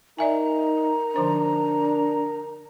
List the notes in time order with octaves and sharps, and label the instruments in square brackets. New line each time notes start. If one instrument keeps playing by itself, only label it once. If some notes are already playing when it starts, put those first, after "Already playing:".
[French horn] D#4 [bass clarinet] A#4 [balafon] D5 E5 G#5 [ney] A#5
[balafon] D3 F3 C5 [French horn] D4